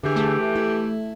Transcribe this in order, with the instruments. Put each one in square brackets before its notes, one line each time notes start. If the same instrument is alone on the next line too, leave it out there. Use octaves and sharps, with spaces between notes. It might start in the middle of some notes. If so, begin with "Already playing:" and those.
[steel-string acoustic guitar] D3 G#4 [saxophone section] E3 G4
[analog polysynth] A3
[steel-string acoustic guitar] E4